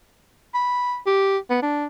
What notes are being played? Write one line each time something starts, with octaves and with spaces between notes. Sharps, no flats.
B5
G4
B3
D4